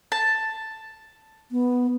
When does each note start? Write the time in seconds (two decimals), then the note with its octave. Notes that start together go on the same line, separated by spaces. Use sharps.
0.12 A5
1.52 B3